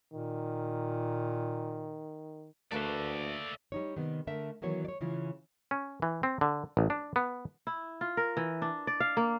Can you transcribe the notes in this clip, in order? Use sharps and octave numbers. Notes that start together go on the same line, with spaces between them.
A#2 D#3
D2 A3 A#3 B4 D5 E5
G3 D#4 C#5
C3 D#3 G3 B3
D3 A3 A#4 E5
D#3 E3 F#3 B3 C#5
C#5 D5
C#3 E3 C#4 F4
C#4
E3
C4
D3
A1
D4
B3
E4
F4
A#4
E3
D4
D5
F5
A#3